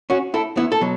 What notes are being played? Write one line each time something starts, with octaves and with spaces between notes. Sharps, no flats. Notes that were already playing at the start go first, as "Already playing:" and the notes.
C#4 F#4
E4 A4
B3 E4
A4
B2 F#3